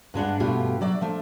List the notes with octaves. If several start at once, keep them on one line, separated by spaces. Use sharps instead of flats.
G2 G#3 D4 F#5
G2 B2 A3 F4 G4
F#3 D5 E5
F3 A3 D4